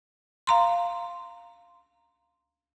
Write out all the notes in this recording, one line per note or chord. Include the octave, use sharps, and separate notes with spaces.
F5 A#5 C6